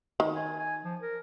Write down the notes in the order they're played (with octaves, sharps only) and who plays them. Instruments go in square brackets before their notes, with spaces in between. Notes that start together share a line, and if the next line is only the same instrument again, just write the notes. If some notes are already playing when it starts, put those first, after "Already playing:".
[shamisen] D#3
[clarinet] G#5
G#5
F3
A#4